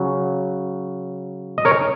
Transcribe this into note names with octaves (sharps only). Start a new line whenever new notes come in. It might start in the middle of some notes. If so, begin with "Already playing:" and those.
Already playing: C#3 F#3
D#5
A#4 C#5